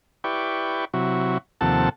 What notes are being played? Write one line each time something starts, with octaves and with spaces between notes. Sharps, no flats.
E4 G4 B4 D5 G5 C#6
C3 F#3 E4 F#4
D#2 C3 F3 A4 F#5 A5